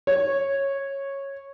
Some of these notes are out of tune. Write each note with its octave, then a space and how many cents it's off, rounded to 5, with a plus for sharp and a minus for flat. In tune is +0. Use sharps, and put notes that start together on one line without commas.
C#5 -10